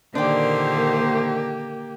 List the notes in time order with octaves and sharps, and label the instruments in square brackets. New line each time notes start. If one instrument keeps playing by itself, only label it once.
[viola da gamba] A#2 D3 D#3 [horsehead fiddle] A#3 G4 [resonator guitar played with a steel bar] D4 G5 [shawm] C5